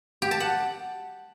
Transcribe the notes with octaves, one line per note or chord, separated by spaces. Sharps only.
G4
A5
F#5